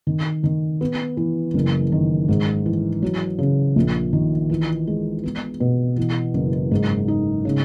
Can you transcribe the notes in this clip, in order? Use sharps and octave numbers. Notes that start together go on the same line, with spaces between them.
D#3
D#3
B3
E3
F#1
D#3
G#2
E3
F#3
C#3
A#1
D#3
E3
G#3
B3
B2
E3
F#1
G#2
D#4
C#3